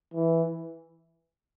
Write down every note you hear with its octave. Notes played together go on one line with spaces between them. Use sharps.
E3